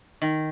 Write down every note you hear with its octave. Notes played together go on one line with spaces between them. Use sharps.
D#3